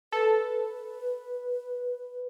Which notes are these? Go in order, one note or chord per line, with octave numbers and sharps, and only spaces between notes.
A4 B4